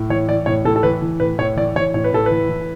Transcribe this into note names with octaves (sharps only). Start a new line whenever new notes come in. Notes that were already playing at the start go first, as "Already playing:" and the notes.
Already playing: A2
E3 C#5
E3 D5
A2 C#5
A2 A4
A4
E3 B4
E3
A2 B4
A2 C#5
E3 D5
E3 C#5
A2 C#5
B4
A2 A4
E3 B4
E3